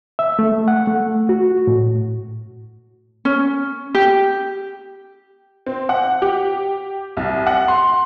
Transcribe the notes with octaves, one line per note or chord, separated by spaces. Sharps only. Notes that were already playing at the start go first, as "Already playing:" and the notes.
E5
A3
F#5
A3
F#4
A2
C#4
G4
C4
F#5
G4
C2
F#5
C6